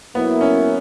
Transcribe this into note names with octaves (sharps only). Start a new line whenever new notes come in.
F#3 A#3 B3 E4 A#4
C#4